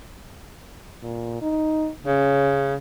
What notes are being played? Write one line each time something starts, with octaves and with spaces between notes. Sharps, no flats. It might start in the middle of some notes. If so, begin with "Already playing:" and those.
A#2
D#4
C#3 C#4